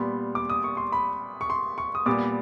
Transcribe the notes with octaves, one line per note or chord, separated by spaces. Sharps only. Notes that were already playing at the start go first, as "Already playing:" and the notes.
Already playing: A#2 G3 B3 C6
D6
D#6
C#6
C6
B5
C#6
C6
C#6
D#6
A#2 G3 B3 D6